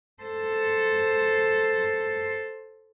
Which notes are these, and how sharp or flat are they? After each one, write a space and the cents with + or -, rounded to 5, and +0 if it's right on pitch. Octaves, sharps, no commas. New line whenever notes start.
A4 +0 C5 +0